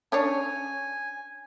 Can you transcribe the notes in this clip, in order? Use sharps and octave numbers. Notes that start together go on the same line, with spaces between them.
C#4 D4 C#5 G#5